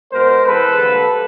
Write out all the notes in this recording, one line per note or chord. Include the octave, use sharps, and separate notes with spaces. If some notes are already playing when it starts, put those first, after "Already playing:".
B2 G#3 B3 A#4 C5
E3 G#3 C4 A4 B4
D3 G3 A#3